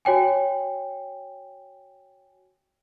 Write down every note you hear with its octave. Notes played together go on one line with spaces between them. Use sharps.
F#4 C#5 G5 G#5